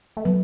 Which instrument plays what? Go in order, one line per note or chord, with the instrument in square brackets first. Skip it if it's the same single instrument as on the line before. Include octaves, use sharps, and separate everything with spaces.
[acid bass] A3
[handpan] F#3 [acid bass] B3